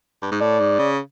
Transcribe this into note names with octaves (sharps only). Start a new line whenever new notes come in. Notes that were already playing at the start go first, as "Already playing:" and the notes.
G2
G#2
A2 D5
G#2
C#3